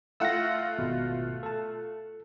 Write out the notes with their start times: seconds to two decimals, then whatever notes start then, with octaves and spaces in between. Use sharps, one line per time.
0.20 A3 F4 F#5 E6 A#6
0.79 G#1 B2
1.43 A4 A5